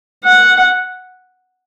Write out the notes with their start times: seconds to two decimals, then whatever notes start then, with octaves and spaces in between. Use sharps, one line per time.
0.24 F#5